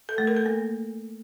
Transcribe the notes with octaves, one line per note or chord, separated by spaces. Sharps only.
A4
A3
A#4
A4
A#3